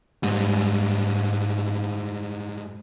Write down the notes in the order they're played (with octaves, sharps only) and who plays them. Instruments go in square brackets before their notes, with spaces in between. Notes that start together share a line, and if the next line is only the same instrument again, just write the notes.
[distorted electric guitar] G#2 G3